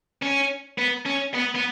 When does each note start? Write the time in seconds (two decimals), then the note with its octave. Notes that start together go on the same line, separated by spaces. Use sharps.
0.22 C#4
0.78 B3
1.06 C#4
1.35 B3
1.55 B3